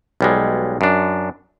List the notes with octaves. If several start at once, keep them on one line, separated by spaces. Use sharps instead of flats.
B1 G3 G#3
F#2 D4